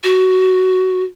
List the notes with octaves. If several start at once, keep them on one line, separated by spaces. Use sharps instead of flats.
F#4